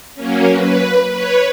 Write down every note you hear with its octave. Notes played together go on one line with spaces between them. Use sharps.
F#3 A#3 C#4
B4
B4 C#5